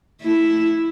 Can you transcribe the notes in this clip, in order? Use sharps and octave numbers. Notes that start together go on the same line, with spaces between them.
A3 E4